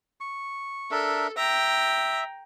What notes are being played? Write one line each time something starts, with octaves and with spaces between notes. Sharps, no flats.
C#6
D4 A4 A#4 E5
E5 G5 A#5